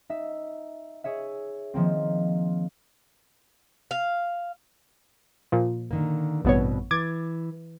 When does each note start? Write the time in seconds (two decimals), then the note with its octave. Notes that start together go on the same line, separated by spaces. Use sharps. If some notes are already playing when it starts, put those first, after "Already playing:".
0.09 D#4 E5
1.04 G#4 C#5 E5
1.74 D#3 F3 A#3 C4
3.91 F5
5.52 A#2 F3
5.91 D3 D#3 A#3
6.45 A1 G2 B2 B3 C4 C#5
6.91 E3 D6 G#6 A6